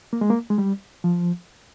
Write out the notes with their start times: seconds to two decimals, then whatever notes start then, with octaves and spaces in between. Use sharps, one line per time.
0.13 A#3
0.21 G#3
0.30 A#3
0.50 G#3
0.58 G3
1.04 F3